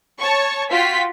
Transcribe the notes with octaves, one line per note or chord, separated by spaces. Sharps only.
C#5 A5 C#6
F4 F#4 G5 B6